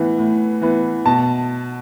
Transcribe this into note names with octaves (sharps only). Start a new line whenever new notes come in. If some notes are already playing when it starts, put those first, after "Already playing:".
Already playing: A2 E3 B3
A2
E3 B3
B2 A5